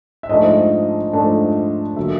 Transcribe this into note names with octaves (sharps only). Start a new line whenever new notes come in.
E5
G#2 F3 A3 D4 D#5
G#2 F3 A3 D4
D3 F#3 A#3 E5